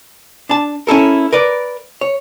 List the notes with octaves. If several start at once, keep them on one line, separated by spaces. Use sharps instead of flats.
D4 A5
C#4 E4 A4 A#4
A#4 B4 D5
C#5